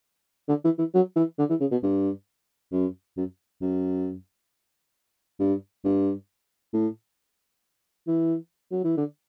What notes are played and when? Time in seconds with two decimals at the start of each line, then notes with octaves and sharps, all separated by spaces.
0.49 D3
0.65 E3
0.79 E3
0.94 F#3
1.16 E3
1.39 D3
1.50 E3
1.60 C#3
1.72 B2
1.83 G2
2.72 F#2
3.17 F#2
3.61 F#2
5.40 G2
5.85 G2
6.74 A2
8.07 E3
8.72 F#3
8.84 E3
8.97 D3